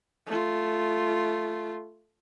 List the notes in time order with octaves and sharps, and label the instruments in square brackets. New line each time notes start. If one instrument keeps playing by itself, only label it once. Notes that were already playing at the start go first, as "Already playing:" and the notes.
[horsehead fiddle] A3 F4